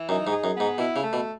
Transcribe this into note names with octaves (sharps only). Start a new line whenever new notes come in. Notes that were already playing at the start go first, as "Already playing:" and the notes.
Already playing: E3
F#2 D#4
G#2
G#4
F#2
B3
G#2
B2 E4
C#3
A3
B2